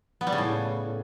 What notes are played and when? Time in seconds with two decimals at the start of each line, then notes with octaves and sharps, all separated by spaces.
0.21 B3
0.27 G3
0.32 C#3
0.38 A2